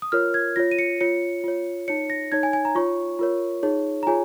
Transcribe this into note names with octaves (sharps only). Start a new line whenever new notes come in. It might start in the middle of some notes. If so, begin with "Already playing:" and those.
D#6
F4 A#4 C#5 F6
G#6
F4 C#5 A#6
D#7
C#7
F4 C#5 C#7
F4 C#5
D#4 C#5 C#7
A#6
D#4 C#5 G#6
G#5
G#5
A#5
F4 C#5 C#6
F4 A#4 C#5
D#4 G#4 C#5
A#5
F4 G#4 C#5 G#5